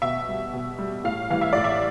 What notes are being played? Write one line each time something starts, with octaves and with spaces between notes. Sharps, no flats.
B2 E5
G3
B2
G3
A2 F5
E3 G3 F5
E5
A2 D5
E5